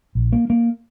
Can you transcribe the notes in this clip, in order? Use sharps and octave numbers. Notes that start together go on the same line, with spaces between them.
A#1
A#3
A#3